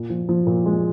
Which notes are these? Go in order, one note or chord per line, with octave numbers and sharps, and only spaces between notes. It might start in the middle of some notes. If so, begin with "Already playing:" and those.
Already playing: A#2
F3
F3
A#2
G#3